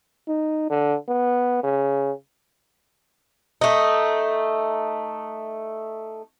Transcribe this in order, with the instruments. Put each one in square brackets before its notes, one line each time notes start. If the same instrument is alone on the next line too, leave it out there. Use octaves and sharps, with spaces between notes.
[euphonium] D#4
D3
B3
C#3
[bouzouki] A3 D#4